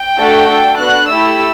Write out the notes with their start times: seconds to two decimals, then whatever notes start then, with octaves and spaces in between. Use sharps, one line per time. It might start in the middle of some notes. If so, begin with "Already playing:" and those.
Already playing: G5
0.17 A3 D4 F#4 A4
0.48 D4 A4
0.79 B3 D4 F#4 F#6
1.10 A3 E4 G4 E6